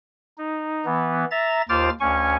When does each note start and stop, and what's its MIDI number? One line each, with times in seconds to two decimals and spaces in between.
0.38 0.85 63
0.86 1.25 52
0.86 1.25 59
1.31 1.62 76
1.31 1.62 82
1.31 1.62 93
1.69 1.89 39
1.69 1.89 65
1.69 1.89 72
1.69 1.89 86
1.69 1.89 89
1.69 1.89 93
2.00 2.36 38
2.00 2.36 61
2.00 2.36 80
2.00 2.36 85